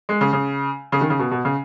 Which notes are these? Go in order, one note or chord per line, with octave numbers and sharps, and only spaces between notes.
G#3
C#3
C#3
C#3
D#3
C#3
B2
B2
C#3